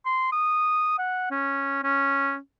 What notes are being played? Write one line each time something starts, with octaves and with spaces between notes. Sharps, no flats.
C6
D#6
F#5
C#4
C#4